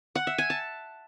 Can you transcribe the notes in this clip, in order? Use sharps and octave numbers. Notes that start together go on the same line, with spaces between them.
F#5
E5
G#5
A5